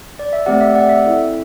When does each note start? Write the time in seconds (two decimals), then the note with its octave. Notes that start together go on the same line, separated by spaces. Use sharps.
0.19 D5
0.33 E5
0.46 A3 C4 G4 D5 F#5
0.61 E5
0.75 D5 F#5
0.89 E5
1.04 C4 E4 A4